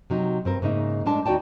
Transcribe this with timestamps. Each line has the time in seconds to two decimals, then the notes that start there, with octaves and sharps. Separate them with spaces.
0.10 C3 F#3 D#4
0.45 G2 C4 A#4
0.62 G#2 C#3 A#3 D#4 E5
1.06 A2 G#3 D4 A5
1.26 D#2 D#4 F#4 D5 G5 A5